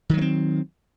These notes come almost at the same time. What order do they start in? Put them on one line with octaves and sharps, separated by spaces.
D#3 F#3 A#3 C4